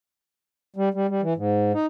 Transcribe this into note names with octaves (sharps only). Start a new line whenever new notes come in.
G3
G3
G3
E3
G#2
D#4